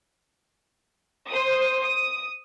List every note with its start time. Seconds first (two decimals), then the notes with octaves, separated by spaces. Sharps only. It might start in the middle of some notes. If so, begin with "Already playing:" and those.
1.29 C5 D#6
1.81 D#6